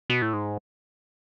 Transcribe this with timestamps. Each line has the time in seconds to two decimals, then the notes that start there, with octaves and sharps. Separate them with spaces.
0.10 B2
0.22 A2
0.33 G#2